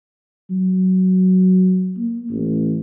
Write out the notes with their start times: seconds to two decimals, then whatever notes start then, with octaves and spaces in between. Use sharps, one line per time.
0.50 F#3
1.97 A#3
2.30 A1